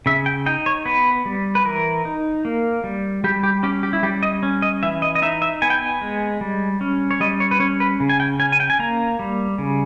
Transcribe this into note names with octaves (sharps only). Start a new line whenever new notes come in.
C#3 E5
G5
D#4 G5
C#5
B3 B4
G3
B4
E3 A#4
D#4
A#3
G3
G3 G4
G4
C#4 G4
G4
E4
G3 G4
D#5
C#4
D#5
E3 E5
D#5
D#5
D#4 E5
E5
B3 G#5
G5
G#5
G#3
G3
C#4
C#5
G3 D#5
C#5
B4
C#4 C#5
B4
C#3
G#5
G5
C#4 G#5
G#5
G5
G#5
A#3 A#5
G3
C#3